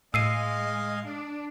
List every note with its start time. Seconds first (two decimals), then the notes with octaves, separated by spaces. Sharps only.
0.14 A2 G#3 D#5 F5 G#5 E6 C7 D#7
1.07 D4